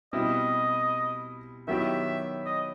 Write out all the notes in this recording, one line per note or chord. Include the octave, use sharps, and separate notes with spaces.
B2 G3 C4 E4 D#5
D#3 F#3 B3 E4 G4 E5
D#5